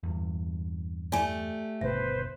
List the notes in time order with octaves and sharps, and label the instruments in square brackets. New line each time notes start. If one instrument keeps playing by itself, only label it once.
[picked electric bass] E2 G2
[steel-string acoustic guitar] A3 G4 [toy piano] D5 G#5 D6
[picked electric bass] G1 D#2 B2 [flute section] B4 C5 [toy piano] E5